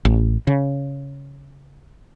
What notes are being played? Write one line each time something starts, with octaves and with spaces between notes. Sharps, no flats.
A1
C#3